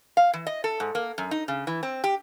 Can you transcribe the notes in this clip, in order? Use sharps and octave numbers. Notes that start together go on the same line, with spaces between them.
F5
E3
D#5
A4
G#2
A#3
F#2
D#4
C#3
E3
C4
G4